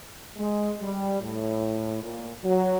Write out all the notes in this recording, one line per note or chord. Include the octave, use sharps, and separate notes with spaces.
G#3
G3
A2
A#2
F#3